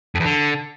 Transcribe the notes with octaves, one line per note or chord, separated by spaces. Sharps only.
F2
E2
D3